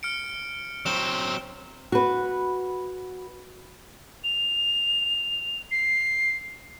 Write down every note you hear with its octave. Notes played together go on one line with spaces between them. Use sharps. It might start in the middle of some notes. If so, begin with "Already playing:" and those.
F6 C#7 D7
F#3 C4 E7 G7
F#4 B4
F7
C7